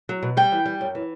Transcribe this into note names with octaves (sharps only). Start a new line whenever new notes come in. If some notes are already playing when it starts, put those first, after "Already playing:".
F#3
B2
G3 G5
E3
G3
F#2
E3